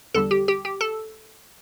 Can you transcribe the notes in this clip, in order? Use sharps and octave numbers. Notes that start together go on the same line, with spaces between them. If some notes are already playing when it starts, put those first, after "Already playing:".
E2 D3 G3 A4
G4
G4
G4
A4